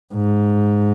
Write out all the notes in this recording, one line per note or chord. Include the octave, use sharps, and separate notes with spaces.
G#2